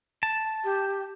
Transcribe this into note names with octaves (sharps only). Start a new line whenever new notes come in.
A5
G4